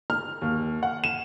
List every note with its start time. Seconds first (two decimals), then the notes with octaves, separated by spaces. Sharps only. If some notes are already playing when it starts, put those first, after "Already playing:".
0.10 F6
0.42 D#2
0.83 F#5
1.04 E7